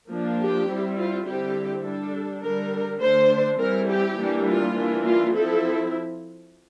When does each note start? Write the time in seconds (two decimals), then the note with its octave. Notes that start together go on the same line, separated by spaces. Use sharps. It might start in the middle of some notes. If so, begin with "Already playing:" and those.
0.09 F3 A#3 D4
0.38 G4
0.67 G3 C4 E4
0.96 F4
1.25 D3 G3 C4 E4 G4
1.83 G3 D4 A4
2.42 D3 G3 D4 A#4
3.00 D3 A3 D4 C5
3.59 E3 G3 C4 E4 A#4
3.89 G4
4.18 E3 G3 A#3 D4
4.47 F4
4.76 E3 A#3 D4
5.05 F4
5.34 F3 C4 E4 A4